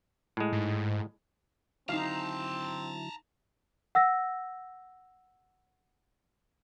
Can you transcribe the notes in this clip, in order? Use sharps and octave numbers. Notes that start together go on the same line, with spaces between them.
A2 G#3
G#2
D3 F#3 C4 D#4 E4 F5 A5 A#5
F#5 E6 A#6